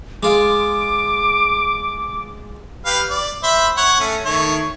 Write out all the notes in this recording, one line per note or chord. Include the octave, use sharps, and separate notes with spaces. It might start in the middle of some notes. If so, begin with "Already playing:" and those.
G#3 F4 D6
G4 B4 F5
D5
C5 E5 B5
C#5 F#5
A3 C#4
D#3 A3 C#5